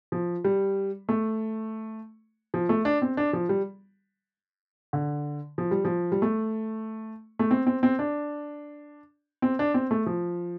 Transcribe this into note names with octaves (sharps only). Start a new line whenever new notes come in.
F3
G3
A3
F3
A3
D4
C4
D4
F3
G3
D3
F3
G3
F3
G3
A3
A3
C4
C4
C4
D4
C4
D4
C4
A3
F3